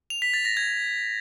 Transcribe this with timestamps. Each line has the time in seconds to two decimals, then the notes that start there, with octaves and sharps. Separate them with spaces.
0.10 F7
0.22 B6
0.34 A6
0.45 A#6
0.57 G#6